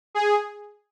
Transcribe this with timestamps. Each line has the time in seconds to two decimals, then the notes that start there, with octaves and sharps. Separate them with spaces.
0.15 G#4